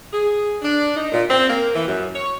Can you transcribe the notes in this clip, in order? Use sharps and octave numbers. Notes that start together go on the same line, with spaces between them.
G#4
D4
D#4
A#2
C4
A#3
E3
F#2
C#5